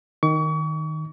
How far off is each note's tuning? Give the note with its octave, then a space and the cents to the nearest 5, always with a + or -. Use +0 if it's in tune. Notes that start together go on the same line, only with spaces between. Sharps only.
D#3 +0 C#6 +35